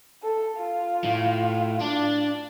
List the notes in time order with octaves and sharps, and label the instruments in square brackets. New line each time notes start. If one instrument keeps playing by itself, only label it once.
[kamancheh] A4
F4
[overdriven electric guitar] A2
D4